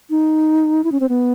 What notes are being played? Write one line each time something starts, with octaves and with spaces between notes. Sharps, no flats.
D#4
E4
C#4
C4
B3